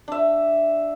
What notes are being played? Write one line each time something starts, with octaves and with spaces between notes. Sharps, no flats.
D4 E5